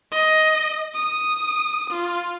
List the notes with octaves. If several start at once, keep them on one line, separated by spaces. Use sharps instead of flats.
D#5
D#6
F4